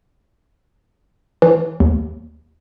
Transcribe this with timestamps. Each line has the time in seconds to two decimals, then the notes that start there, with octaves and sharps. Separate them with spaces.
1.42 E3
1.80 D#2